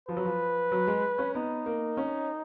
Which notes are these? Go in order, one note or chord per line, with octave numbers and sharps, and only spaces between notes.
F3 B4
F#3
F3
F#3
G#3
C#4
B3 D#4
A#3
C#4